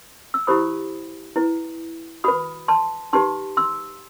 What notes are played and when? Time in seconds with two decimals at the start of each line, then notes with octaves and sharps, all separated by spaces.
0.34 E6
0.47 E4 G4 C5 B5 D#6
1.36 E4 B4
2.24 F#4 B4 B5 D#6
2.68 A5 C6
3.13 D#4 G4 B4 A5 C6
3.57 C6 E6